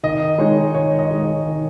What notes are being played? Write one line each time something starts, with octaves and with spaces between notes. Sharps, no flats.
D#3 D#5
G#3 D#4 C#5
D#3 C#5
D#5
G#3 D#4
C#5
D#3